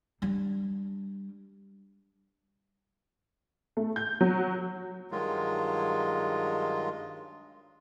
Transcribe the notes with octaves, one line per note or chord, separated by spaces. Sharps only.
G3 D4
A3
G6
F#3
G2 D#3 F#3 G#3 F4